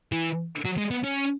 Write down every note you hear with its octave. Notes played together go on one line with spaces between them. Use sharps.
E3
F#3
G#3
B3
C#4